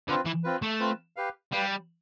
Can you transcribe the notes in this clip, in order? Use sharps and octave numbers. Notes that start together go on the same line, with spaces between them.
D3 C4 F4 B4
E3
C4 F4 B4
A3
C4 F4 B4
G4 B4 F5
G3 G4 B4 F5